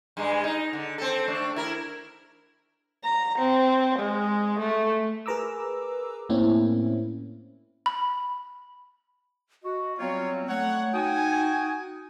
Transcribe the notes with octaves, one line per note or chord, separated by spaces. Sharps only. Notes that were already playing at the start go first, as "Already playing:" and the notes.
G2 G#3
D#4
D3
C4 A4
A3 D4
E4 A#4
A#5
C4
G#3
A3
G#4 A#4 B4 A#5 D6 E6
A2 A#3 C4 C#4 E4
B5
F#4 D#5
F#3 G3 B3 C4 F4 C#5
A3 C#5 F#5
D#4 F#4 G5 G#5 D#6